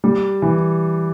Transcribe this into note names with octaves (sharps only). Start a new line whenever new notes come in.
G3
E3